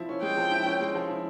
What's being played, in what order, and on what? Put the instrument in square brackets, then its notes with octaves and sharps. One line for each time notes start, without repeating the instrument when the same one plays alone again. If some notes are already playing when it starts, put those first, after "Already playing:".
Already playing: [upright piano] F3 E4
C#4
[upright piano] G#3 [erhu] G5
[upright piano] F3
E4
C#4
G#3
F3
E4